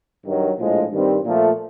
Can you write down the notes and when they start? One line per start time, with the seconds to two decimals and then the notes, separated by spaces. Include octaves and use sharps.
0.25 G2 D#3 F#3
0.58 A#1 A2 F3 G#3
0.91 G2 D#3 G3 C4
1.24 A#2 F3 A3